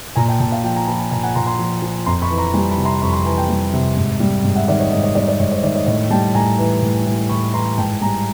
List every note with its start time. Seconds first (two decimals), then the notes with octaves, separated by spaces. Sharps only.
0.16 A#2 G#5 A#5
0.28 G5 A5
0.40 A#2 G5 A5
0.51 F5 G5
0.63 F3 G5 A5
0.76 G#5 A#5
0.87 F3 A5 B5
0.99 G#5 A#5
1.11 A#2 G#5 A#5
1.23 F#5 G#5
1.35 A#2 A#5 C6
1.46 A#5 C6
1.59 F3
1.82 F3
2.06 F2 A#5 C6
2.22 B5 C#6
2.31 E3
2.38 A#5 C6
2.54 G3 G#5 A#5
2.70 A5 B5
2.78 C3
2.85 A#5 C6
3.02 F2 B5 C#6
3.13 A#5 C6
3.25 E3 G#5 A#5
3.37 G5 A5
3.49 G3
3.73 C3
3.97 G#2
4.20 G3
4.45 G#2
4.56 E5 F#5
4.68 D#3 D5 E5
4.80 C#5 D#5
4.92 G#2 C#5 D#5
5.03 C#5 D#5
5.15 G3 D5 E5
5.28 D5 E5
5.40 G#2 C#5 D#5
5.51 C5 D5
5.63 D#3 D5 E5
5.75 C#5 D#5
5.87 A2 C#5 D#5
6.10 G3 G5 A5
6.35 A2 G#5 A#5
6.58 E3
6.82 A2
7.06 G3
7.29 A2 B5 C#6
7.54 E3 A#5 C6
7.77 G#2 G5 A5
8.01 G3 G#5 A#5